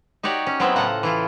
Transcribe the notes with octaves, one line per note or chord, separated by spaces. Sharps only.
D#4 F#4 G4 C#5 D5
C#4
F#3 G#3 B3 C4 E4 E5
A2 C#3 F4 A4 F#5 A#5
E3 E4 F4